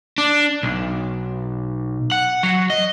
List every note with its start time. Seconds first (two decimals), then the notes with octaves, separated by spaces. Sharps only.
0.18 D4
0.63 B1
2.11 F#5
2.43 F#3
2.70 D#5